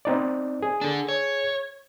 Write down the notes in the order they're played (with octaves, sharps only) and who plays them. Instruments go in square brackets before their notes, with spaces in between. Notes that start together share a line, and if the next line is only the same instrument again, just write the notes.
[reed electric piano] C4 D#4 D5
G#4
[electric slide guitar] D4 A4
C#5